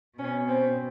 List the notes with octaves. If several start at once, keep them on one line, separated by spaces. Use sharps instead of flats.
B2 C#4
C4